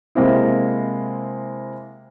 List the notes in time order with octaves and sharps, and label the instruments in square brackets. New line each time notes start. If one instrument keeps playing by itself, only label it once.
[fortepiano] C3 G#3 A#3 C4 E4